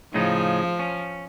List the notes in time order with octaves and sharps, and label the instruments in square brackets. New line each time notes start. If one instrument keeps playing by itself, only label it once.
[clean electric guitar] A2 C#3 D#4 [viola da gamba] F3
[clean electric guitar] C#4